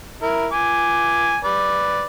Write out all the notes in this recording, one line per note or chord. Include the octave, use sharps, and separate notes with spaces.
E4 A#4
G#5 D6
B4 D5